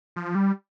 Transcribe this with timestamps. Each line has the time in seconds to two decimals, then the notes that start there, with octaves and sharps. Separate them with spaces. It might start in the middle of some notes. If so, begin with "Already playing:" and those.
0.16 F3
0.35 G3